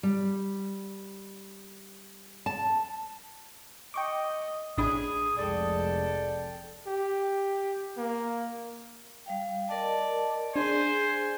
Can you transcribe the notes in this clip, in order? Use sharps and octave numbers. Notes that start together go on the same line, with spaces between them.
G3
A5
D#5 G5 C#6 D6
A1 D4 G#4 B5 D#6
F1 C2 G#3 A4 D5 G5
G4
A#3
G3 F5 G5
A#4 D5 D#5 A5
D4 G#4 C5 G#5 C6